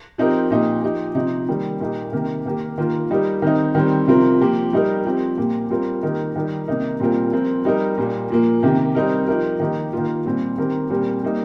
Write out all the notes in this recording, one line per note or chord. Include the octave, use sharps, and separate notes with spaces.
F3 C4 D#4 G4 A#4
A#2 F3 D#4 G4
F3 D#4 G4
C3 F3 D#4
D#3 G3 A#3
A#2 A#3 D#4 G4
C3 D#3 A#3 G4 A#4
D#3 A#3 G4 A#4
D#3 A#3 F4 A#4
G3 D#4 G4 A#4
D#3 C4 D#4
D#3 G3 C4
C3 F3 C4 F4 A#4
F3 A#3 G4 A#4
G3 D#4 G4 A#4
F3 C4 G4
A#2 A#3 G4
G3 C4 F4 A#4
D#3 A#3 D#4 G4 A#4
D#3 G3 D#4 G4 A#4
C3 D#3 A#3 D#4 A#4
A#2 G3 C4 F4 A#4
F3 C4 F4 A#4
G3 D#4 A#4
A#2 G3 A#3
A#2 F3 A#3
C3 D#3 A#3 G4
G3 C4 D#4 A#4
F3 D#4 G4 A#4
D#3 A#3 D#4 G4
D#3 A#3 F4
A#2 G3 C4 G4
D#3 C4 G4 A#4
A#2 G3 C4 G4 A#4
G3 A#3 D#4